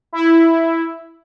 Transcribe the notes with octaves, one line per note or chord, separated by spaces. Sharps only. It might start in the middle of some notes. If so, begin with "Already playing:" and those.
E4